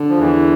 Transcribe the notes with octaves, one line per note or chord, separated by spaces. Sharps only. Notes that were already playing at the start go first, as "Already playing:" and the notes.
Already playing: D3
F3
E2 E3